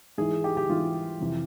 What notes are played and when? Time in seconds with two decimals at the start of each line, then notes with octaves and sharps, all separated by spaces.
0.18 G#2 E3 G#4
0.44 G4
0.57 G4
0.69 G#2 E3 F4
1.21 F2 C3 E3